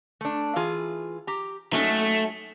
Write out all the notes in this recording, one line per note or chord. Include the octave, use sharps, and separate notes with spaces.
A3 D4
E3 F4 G#4
G4 A#5
F#3 A3 C#4 D#4